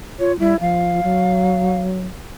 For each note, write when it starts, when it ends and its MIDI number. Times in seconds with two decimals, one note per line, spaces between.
0.19 0.37 65
0.19 0.32 73
0.39 0.54 55
0.39 0.56 64
0.61 1.00 53
0.61 1.80 77
1.04 2.06 54